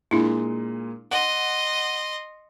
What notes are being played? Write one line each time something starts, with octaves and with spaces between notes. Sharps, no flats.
A#2 G#3 A#3 D4 E4
D#5 F#5 C6